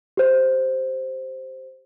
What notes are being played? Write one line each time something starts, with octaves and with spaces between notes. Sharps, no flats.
G4 C5